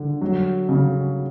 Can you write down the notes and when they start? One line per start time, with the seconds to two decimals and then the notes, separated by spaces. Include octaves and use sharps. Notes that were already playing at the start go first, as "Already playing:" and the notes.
Already playing: D3
0.21 F#3
0.69 C#3